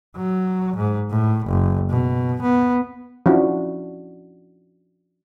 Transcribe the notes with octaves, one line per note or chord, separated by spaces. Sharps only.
F#3
G#2
A2
F#1
B2
B3
F3 C#4 D4 E4 F#4